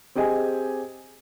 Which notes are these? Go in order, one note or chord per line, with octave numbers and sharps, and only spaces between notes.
C4 G4 G#4 D#5 G#5